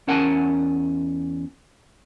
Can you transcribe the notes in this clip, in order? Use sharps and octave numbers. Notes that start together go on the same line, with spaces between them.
E2 C#4 A#4 F#5 G#5 A5